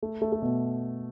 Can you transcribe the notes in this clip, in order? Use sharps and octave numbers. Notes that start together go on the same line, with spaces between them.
A3
A3
A3
B2